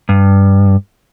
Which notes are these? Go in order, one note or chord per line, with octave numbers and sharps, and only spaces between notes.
G2